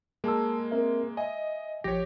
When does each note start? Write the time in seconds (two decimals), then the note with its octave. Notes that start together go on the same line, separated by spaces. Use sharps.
0.24 G#3 A#3 G#4 A5 E6
0.71 C4 A#4 E5
1.17 D#5 E5 G#5
1.84 A1 F3 G4 C#5 A#6